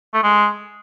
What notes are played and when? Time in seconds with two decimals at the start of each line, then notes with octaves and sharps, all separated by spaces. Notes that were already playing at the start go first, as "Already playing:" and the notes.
0.14 A3
0.23 G#3